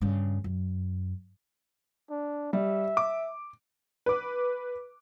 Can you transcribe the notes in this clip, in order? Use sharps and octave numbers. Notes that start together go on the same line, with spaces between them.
G2 C#3
F#2
D4
G3 E5
D6
B4 D6